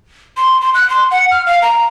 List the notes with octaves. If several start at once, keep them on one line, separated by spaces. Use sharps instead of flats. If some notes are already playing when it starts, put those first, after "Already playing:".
C6
C6
F#6
C6
F#5
F6
F5
A#5